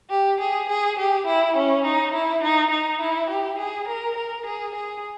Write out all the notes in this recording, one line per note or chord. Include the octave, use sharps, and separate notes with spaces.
G4
G#4
G#4
G4
E4
C#4
D#4
E4
D#4
D#4
E4
G4
G#4
A#4
A#4
G#4
G#4